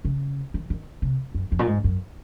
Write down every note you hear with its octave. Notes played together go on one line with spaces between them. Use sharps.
C#3
D#3
D#3
C3
F#2
F2
A#2
G#2
F#2